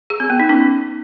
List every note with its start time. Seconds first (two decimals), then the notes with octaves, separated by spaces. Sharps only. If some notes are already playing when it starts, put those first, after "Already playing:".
0.10 G#4
0.20 C4
0.30 B3
0.40 D#4
0.49 C#4